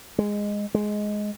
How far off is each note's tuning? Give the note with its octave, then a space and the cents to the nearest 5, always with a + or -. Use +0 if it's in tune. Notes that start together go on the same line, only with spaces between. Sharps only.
G#3 -10
G#3 +10